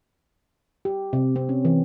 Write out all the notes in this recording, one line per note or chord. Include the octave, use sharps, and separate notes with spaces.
G4
C3
C4
C#4
E3